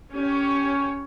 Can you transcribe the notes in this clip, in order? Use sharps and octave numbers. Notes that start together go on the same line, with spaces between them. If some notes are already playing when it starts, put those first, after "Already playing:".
C#4 G4 C#5